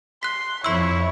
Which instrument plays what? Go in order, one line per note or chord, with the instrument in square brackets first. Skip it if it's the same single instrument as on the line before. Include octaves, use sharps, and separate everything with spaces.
[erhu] C6 [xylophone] F#6 B6
[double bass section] F2 [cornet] E4 [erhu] C#5 [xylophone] C6 E6